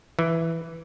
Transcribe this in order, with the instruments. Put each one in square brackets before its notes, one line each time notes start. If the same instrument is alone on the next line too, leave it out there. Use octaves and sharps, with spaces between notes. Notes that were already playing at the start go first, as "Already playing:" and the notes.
[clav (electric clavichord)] E3